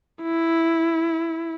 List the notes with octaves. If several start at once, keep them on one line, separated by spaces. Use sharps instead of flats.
E4